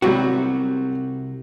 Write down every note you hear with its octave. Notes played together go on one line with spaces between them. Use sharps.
C2 C3 F#3 G3 F#4